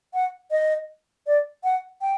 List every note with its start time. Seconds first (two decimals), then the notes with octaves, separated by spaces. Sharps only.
0.14 F#5
0.51 D#5
1.27 D5
1.64 F#5
2.02 G5